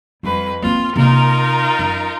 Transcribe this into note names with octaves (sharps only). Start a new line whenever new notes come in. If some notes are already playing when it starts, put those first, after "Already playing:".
F2 G3 B4
A#3 C4 F4
C3 A#3 D#4 F4 A#4
F#2